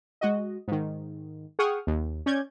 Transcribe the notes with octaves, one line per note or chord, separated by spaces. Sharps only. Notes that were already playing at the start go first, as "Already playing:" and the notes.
G#3 F#4 D#5
G#2 D#3
G#4 F#5 G5 C#6 D#6 F6
D#2
C#4 D5 G6 G#6